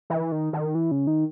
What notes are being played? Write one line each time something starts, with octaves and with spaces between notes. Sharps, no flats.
E3
D#3
D#3
E3
C#3
D#3